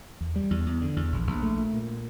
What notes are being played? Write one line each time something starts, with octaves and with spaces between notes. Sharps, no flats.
E2
G3
E2
E2
D3
E2
A#1
A#1
A3
A#2
A#2